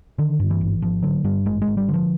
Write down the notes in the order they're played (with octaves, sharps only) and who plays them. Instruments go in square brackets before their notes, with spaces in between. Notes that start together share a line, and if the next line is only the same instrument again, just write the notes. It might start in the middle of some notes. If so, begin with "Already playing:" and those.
[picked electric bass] D3 D#3
G2
E3
G#1
G#1 F3
D3 F#3
G2 G3
G#1 G#3
G#3
G#1
G3
D3 F3